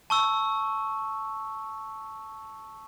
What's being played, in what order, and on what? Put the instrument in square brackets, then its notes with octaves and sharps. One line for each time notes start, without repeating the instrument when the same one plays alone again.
[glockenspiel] A5 C#6 E6